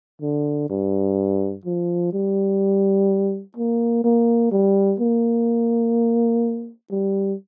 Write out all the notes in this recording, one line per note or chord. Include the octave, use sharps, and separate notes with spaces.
D3
G2
F3
G3
A#3
A#3
G3
A#3
G3